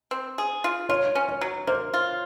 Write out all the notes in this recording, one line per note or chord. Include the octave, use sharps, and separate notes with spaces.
C4
G#4
F4
F4 C#5
C#4
C#5
F#3
A#3 C5
F4